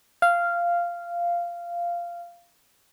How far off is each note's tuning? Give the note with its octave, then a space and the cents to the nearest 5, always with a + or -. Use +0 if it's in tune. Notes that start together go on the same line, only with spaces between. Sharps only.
F5 -10